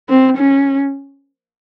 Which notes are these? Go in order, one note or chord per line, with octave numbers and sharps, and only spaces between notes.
C4
C#4